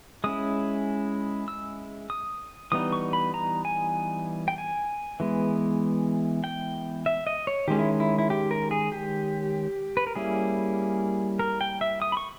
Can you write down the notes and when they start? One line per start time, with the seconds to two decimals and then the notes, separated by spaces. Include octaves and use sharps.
0.24 G#3 C#4 E4 D#6
1.48 E6
2.10 D#6
2.72 E3 G3 B3 D#4 D#6
2.92 C#6
3.13 B5
3.34 A#5
3.65 G#5
4.48 G5
4.58 G#5
5.20 E3 G#3 B3
6.44 G5
7.06 E5
7.27 D#5
7.47 C#5
7.68 D#3 G#3 C#4 G4
7.79 E4
8.00 E4
8.18 E4
8.30 G4
8.51 A#4
8.71 G#4
8.92 G4
9.97 B4
10.07 A#4
10.16 G3 A#3 C#4 E4 G#4
11.39 A#4
11.61 G5
11.81 E5
12.02 D#6
12.12 B5
12.17 C#6